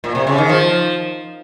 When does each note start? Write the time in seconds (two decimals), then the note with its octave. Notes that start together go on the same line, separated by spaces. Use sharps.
0.04 A#2
0.15 C3
0.27 C#3
0.38 D#3
0.49 F3